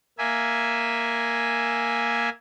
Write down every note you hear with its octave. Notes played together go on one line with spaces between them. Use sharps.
A#3 E5 G#5